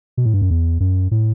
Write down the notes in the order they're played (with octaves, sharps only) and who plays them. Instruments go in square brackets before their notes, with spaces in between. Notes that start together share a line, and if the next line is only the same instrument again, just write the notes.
[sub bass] B2
A2
G2
F#2
E2
F#2
A2